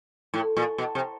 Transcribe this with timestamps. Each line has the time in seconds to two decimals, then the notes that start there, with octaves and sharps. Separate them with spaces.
0.34 A2
0.57 A#2
0.78 B2
0.95 C3